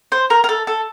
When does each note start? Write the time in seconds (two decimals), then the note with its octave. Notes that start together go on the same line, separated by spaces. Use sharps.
0.12 C5
0.30 A#4
0.44 A#4
0.49 A4
0.67 A4